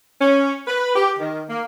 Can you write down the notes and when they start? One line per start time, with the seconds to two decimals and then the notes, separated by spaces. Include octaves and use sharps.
0.21 C#4
0.68 B4
0.96 G4
1.20 D#3
1.50 A#3